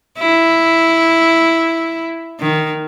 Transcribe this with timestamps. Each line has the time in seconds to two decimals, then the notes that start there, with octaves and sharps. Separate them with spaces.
0.19 E4
2.40 D#3